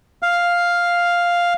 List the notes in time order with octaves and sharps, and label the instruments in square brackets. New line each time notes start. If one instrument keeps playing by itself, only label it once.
[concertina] F5